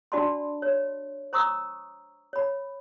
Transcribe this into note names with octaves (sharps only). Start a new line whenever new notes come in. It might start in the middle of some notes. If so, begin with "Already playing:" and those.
D4 F#4 D5 A5 B5 C6
C#5
C5 A#5 C#6 D#6 E6
C#5 B5